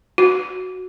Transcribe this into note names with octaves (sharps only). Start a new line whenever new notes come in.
F#4